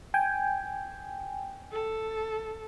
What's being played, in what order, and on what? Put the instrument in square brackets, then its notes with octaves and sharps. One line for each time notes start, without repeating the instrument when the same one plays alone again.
[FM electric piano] G5 G#5
[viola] A4